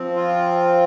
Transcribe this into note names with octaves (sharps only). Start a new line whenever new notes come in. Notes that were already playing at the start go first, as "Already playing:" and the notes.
Already playing: F3 C4
F4